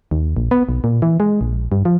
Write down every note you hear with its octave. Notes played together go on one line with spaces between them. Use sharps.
D#2
A#1
B3
B1
A#2
E3
G#3
A#1
G2
F3